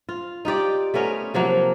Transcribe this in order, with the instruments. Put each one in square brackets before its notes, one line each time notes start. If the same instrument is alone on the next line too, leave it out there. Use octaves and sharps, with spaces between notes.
[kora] F4
D#4 F4 G4 D5
A3 B3 C#4 A#4
C3 F3 F#3 A#3